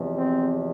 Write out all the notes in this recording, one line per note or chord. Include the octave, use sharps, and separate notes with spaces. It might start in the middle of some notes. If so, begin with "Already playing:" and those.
Already playing: E2 C3 F3 G#3
C4